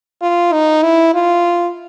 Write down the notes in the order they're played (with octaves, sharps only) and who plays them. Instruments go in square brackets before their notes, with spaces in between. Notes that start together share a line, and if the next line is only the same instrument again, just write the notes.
[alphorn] F4
D#4
E4
F4